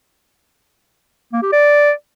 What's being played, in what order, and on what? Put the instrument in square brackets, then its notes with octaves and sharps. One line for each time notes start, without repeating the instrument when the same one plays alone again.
[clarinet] A#3
G4
D5